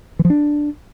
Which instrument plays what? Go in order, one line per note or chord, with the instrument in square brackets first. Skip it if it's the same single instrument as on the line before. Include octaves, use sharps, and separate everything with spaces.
[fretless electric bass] E3
F3
D4